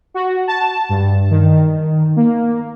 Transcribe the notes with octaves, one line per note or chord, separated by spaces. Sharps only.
F#4
A5
G2
D#3
A#3